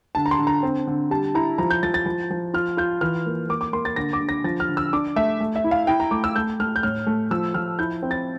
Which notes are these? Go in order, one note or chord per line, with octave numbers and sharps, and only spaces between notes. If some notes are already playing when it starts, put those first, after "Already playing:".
D3 A5
A#5
C6
D3
A#5
C4
D3
G3 A5
E4 A#5
F3 A#5
G6
F3 A6
A6
F3
F3
F4 F6
F4 G6
E3 F6
A#3
A#3 D6
D6
A#3 C6
A6
D3 A#6
D6
D3
A#6
F3 A6
F6
D3
E6
D4 D6
A3 E5
A3
E5
E4
F5
E4 G5
A#5
A3 D6
E6
A3 G6
A3 F6
G6
A2 F6
A3
F3 E6
F3 F6
E4 G6
C4
A6